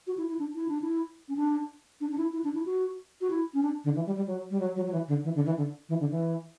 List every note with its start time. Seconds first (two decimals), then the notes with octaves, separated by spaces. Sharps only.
0.07 F#4
0.18 E4
0.29 E4
0.39 D4
0.55 E4
0.68 D4
0.82 E4
1.28 C#4
1.37 D4
2.01 D4
2.12 D4
2.18 E4
2.33 E4
2.44 D4
2.54 E4
2.66 F#4
3.21 F#4
3.30 E4
3.54 C#4
3.63 D4
3.84 D3
3.95 E3
4.06 G3
4.16 G3
4.27 F#3
4.50 G3
4.60 F#3
4.76 F#3
4.86 F#3
4.93 E3
5.08 D3
5.24 E3
5.35 D3
5.46 E3
5.57 D3
5.89 E3
6.00 D3
6.11 E3